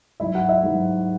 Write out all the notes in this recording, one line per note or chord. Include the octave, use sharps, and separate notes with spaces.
G#2 F#3 E4 E5
F#4 F#5
E4 E5
G#2 F#3